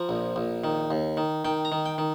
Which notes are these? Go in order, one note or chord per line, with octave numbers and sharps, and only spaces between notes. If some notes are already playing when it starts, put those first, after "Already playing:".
Already playing: F3 A#5
A#1
A#1
D#3
D#2
D#3
D#3 G5
A#5
D#3
G5
D#3